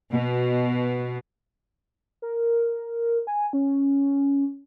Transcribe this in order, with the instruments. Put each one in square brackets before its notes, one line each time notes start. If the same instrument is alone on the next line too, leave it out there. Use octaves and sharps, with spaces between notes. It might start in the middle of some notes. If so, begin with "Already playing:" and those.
[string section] B2
[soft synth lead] A#4
G#5
C#4